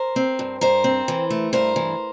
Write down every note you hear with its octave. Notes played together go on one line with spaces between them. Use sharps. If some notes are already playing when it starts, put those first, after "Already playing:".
Already playing: A#4 C5
C4
G2
G2 A#4 C5
C4
E3
A3
G2 A#4 C5
E3